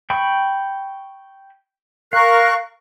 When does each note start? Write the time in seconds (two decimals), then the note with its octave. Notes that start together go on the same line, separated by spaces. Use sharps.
0.10 G5 B5 C#6
2.13 A#4 F5 C#6 F#6